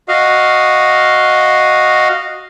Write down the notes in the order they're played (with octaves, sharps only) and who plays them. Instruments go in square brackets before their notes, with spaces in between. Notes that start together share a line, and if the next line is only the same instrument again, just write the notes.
[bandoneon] F#4 D#5 F5